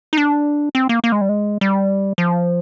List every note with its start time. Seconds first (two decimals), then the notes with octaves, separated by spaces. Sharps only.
0.13 D#4
0.17 D4
0.75 C4
0.89 A#3
1.04 A#3
1.12 G#3
1.21 G3
1.29 G#3
1.61 G3
2.18 F3